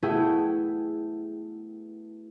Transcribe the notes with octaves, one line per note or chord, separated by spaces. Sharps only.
A3 B3 E4 F#4 G#4 G5